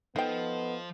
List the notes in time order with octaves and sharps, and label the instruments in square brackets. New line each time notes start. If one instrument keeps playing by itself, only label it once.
[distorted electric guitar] F3 [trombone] B3 [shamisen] D#4 G5 [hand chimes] A4 D#5